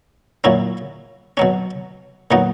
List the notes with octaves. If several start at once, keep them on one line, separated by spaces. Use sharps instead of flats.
A#2 F#3 C#4 E4
B2 F#3 C#4
A#2 F#3 B3 D#4